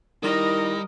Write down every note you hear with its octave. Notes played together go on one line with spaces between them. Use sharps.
D#3 G3 E4 A#4 D#5